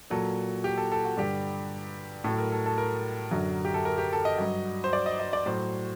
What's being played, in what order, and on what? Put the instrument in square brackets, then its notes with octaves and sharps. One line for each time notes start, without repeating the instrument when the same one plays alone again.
[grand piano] A#2 F#3 A4
G4
A4
A4
F#4
G2 D3 G3 G4
A2 F#3 A4
A#4
A4
A4
A#4
F#2 D3 F#3
G4
A4
A#4
G4
A4
D#5
G2 F#3
C5
D5
D#5
D#5
D5
A2 F#3 C5